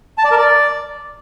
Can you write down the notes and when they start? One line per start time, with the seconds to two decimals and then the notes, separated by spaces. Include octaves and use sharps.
0.18 A5
0.25 D5
0.31 A#4
0.38 D5